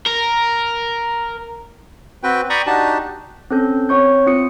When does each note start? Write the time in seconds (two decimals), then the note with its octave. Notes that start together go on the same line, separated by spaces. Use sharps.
0.06 A#4
2.23 C4 F#4 B4 G5
2.50 D5 G5 A#5 B5 C#6 D#6
2.66 D4 D#4 F#4 G4 A5
3.51 C4 C#4 A4 G6
3.89 C4 C#5 C#6 G6
4.27 C4 F4 D#6 C#7